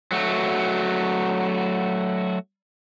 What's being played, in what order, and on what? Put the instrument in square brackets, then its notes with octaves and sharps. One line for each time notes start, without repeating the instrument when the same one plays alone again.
[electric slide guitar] F#3 A3 F#4